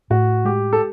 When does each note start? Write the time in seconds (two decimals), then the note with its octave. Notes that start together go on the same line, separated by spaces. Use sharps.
0.10 A2 F#4
0.45 G#3 G4
0.73 A4